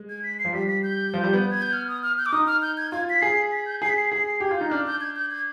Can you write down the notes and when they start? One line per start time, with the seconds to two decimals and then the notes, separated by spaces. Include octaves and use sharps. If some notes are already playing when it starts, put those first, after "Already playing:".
Already playing: G#3
0.09 G#6
0.23 B6
0.39 C7
0.45 F3
0.53 G3 B6
0.68 B6
0.83 G6
1.14 F3
1.24 G3
1.33 B3
1.51 G#6
1.62 G6
1.73 F6
1.88 D#6
2.02 F6
2.18 G6
2.26 D6
2.32 D#4 D#6
2.47 F6
2.62 G6
2.77 G#6
2.92 F4 G#6
3.10 B6
3.21 G#4 C7
3.51 B6
3.66 G6
3.82 G#4 C7
3.89 B6
3.97 C7
4.12 G#4 C7
4.26 C7
4.40 G4 G#6
4.51 F4
4.57 D#4 G6
4.70 D4 F6
4.86 G6
5.01 G#6
5.16 G6
5.30 G#6